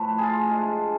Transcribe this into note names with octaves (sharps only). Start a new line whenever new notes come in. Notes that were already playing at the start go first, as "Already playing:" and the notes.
Already playing: A2 F3 A3 B4
F4 G#4
C3 G#3 D4